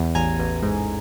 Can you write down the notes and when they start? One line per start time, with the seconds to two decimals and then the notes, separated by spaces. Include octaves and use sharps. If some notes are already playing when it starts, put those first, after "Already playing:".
Already playing: E2
0.15 A1 G#5 A#5
0.39 A1
0.62 G#2